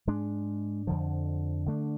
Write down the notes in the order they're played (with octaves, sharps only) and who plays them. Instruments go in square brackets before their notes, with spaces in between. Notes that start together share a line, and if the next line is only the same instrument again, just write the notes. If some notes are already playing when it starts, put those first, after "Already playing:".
[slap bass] G#2 G#3 D4
F2 D3 F3
D3 A3 D4